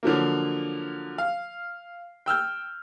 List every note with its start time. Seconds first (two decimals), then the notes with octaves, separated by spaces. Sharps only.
0.03 D3 F3 F#3 A#3
1.18 F5
2.26 G5 E6 F6 G6